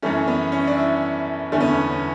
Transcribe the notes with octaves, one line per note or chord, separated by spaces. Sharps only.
F#2 E3 A3 C#4
B3
C#4
D4
E4
E2 D3 A3 C#4
B3
C#4
C#4